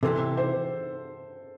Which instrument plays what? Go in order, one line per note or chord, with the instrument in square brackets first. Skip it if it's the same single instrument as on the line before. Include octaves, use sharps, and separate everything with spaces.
[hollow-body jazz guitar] C3 E3 C4 G4 [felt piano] A4
[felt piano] C5